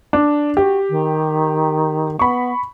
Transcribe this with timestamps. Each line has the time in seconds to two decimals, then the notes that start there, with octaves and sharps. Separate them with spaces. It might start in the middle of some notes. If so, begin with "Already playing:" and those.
0.13 D4
0.57 F#4 G4
0.89 D#3
2.19 B3 B5 C#6